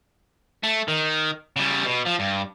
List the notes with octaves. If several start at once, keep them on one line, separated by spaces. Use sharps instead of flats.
A3
D#3
C#3 G3
B2
F3
G2